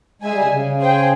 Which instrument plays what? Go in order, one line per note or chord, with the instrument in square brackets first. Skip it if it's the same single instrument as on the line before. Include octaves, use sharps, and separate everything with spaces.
[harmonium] G#3 [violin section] G#4 E5 G#5
[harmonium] G3
C#3
C#3
[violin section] G#4 C5 G5